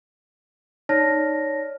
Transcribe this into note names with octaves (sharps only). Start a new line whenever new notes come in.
D#4 C#5 D5 A5 F6 A#6